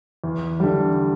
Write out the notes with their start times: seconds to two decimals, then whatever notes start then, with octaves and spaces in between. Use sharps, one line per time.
0.24 E2
0.60 D3 G3